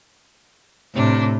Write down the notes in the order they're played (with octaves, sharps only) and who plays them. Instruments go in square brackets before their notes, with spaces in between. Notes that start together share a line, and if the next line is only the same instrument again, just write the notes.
[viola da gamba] A2 [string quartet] C3 D4